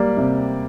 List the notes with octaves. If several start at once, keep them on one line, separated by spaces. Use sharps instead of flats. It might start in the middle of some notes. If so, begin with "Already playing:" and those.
Already playing: G3 A#3 G4 D5
C3